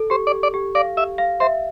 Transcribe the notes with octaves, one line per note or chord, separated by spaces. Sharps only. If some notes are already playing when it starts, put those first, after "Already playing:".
Already playing: A4
G4 C5
D5
G4
D5
G4
D5 F5
G4 E5
F5
C5 E5